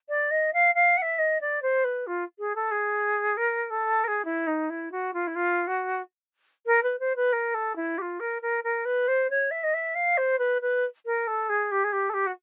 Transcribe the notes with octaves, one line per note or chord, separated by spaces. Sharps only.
D5
D#5
F5
F5
F#5
E5
D#5
D5
C5
B4
F4
G#4
A4
G#4
A#4
A4
A#4
G#4
E4
D#4
E4
F#4
F4
E4
F4
F#4
A#4
B4
C5
B4
A#4
A4
E4
G4
F4
A#4
A#4
A#4
B4
C5
C#5
E5
D#5
E5
F5
C5
B4
B4
A#4
A4
G#4
G4
G#4
G4
A4
G4
F#4